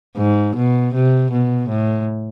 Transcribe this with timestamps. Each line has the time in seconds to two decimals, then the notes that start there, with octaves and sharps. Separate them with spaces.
0.17 G#2
0.56 B2
0.94 C3
1.32 B2
1.69 A2